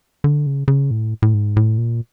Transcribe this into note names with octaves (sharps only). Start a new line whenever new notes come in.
D3
C#3
C#3
A2
A2
G#2
A2
A#2